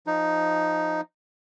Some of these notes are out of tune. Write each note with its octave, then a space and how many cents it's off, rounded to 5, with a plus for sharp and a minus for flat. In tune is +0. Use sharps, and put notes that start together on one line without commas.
F3 +0 D#4 +0